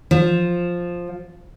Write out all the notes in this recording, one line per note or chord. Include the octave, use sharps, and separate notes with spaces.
F3